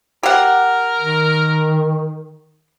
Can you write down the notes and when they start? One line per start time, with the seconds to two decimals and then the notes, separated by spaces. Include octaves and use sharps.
0.23 G4 A#4 F#5
0.98 D#3